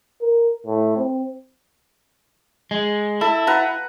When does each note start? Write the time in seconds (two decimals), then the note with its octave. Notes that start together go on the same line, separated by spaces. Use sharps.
0.21 A#4
0.67 A2
0.97 C4
2.71 G#3
3.21 E4 A4
3.47 B4 F#5 A#5